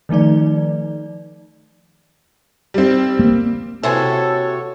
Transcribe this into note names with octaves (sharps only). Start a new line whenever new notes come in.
D#3 F3 A3 D#4 D5
G3 C4
A#3
C3 E3 F#4 A4 C5 C#5 G#5